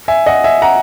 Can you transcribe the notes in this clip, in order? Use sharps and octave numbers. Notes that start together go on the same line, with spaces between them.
E5 G#5
D#5 F#5
E5 G#5
F#5 A#5